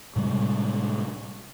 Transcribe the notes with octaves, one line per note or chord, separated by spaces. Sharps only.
A2 C3 G3 G#3